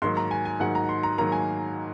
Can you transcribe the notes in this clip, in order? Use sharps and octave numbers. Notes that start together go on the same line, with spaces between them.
G#2 D#3 F#3 A#3 C6
A#5
G#5
G#5
G#2 D#3 F#3 A#3 F#5
A#5
C6
A#5
G#2 D#3 F#3 A#3 A#5
G#5